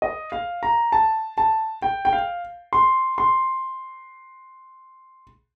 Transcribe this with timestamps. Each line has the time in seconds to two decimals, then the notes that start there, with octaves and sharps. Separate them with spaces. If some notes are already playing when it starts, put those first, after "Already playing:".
0.02 D#5
0.32 F5
0.63 A#5
0.92 A5
1.38 A5
1.82 G5
2.05 G5
2.13 F5
2.73 C6
3.18 C6